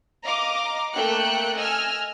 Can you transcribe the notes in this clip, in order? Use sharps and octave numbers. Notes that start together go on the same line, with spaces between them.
D#5 F5 A#5 D6
A3 A#3 G5 F#6 C#7
D#5 G#5 E6 F6